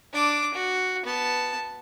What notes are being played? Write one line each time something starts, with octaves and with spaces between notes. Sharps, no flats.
D4 D6
F#4
B3 A5